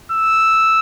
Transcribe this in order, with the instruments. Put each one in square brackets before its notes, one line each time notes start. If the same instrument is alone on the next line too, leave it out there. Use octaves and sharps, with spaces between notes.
[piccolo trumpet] E6